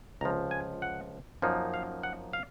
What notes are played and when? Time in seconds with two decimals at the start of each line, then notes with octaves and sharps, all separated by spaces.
0.21 C#2 C3 F3 A#5
0.51 G#5
0.82 F#5
1.42 F#2 F3 A#3 D#4
1.74 F5
2.03 F#5
2.33 F5